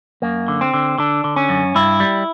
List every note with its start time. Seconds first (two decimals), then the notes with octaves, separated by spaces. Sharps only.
0.22 F#2 A#3
0.48 D3
0.61 C4
0.74 D3
0.98 D3 D4
1.24 D3
1.36 C#4
1.49 F#2
1.75 G2 E4
2.00 G3